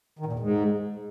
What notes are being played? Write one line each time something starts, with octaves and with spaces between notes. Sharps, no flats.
D#3
A#2
E2
G#2